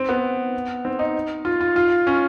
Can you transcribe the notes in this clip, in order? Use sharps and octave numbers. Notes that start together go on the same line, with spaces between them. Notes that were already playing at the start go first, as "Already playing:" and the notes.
Already playing: C4
B3
C4
D#4
F4
F4
F4
C#4